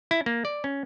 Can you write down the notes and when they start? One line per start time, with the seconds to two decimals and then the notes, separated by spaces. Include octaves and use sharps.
0.11 E4
0.26 A#3
0.45 D5
0.64 C#4